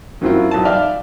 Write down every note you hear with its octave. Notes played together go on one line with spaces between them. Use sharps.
F#2 F#3 C4 E4 F4
B1 A5
D5 E5 F5 G5 F6